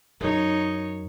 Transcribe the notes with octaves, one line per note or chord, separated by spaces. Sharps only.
F#2 D#4 C#5